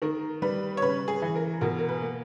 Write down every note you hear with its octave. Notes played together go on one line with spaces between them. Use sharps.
D#3 A#4
G3 B4
C#5
C#3 B4
G#4
E3
A#4
B2 A#4
A#4
B4
A#3